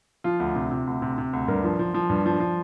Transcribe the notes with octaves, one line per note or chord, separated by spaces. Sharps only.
F3 F4
D2
C3
C3
D2
C3
C3
D2
G2 A#4
F3
F3
F3
G2
F3
F3